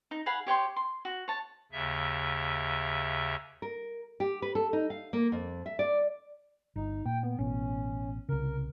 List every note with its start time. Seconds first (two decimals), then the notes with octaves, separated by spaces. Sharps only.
0.11 D#4
0.26 G#4 F5 F#5 B5
0.47 G4 C#5 G5 C6
0.76 C6
1.05 F#4
1.28 C#5 A5
1.72 D#2 C#3 E5
3.62 A#4
4.20 G4
4.42 B4
4.55 A4
4.73 D#4
4.90 F5
5.13 A#3
5.32 F2
5.66 E5
5.79 D5
6.76 G1 D#4
7.06 A#2 G5
7.23 B3
7.39 A1 B2 C#4
8.29 C2 C#3 A#4